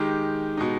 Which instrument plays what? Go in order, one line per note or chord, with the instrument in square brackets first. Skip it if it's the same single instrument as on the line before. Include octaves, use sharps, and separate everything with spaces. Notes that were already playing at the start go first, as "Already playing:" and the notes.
Already playing: [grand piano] D#3 G#3 D#4 G4
B2 G#3 D#4